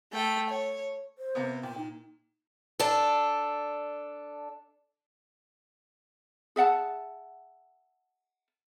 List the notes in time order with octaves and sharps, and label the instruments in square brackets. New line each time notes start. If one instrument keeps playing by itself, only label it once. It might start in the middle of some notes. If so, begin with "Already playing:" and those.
[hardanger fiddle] A3 G5
C#5
[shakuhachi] C5
[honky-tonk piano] C3 A#3 B3
[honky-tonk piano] A#2 [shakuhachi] G5
[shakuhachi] D#4
[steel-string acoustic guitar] D4 A4
[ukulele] G#4 E5 F#5 A5